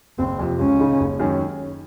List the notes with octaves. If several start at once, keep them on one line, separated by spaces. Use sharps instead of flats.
F#1 C4
F2 C3 F3
C#2 C#4
C#3 G#3 D#4
F#1
F#2 D#3 G#3 C#4